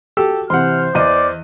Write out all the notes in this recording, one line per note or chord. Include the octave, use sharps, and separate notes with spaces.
F#4 G4 A4 E6
C3 E3 C5 F#5 C6 F6
E2 E3 D5 D#5 D#7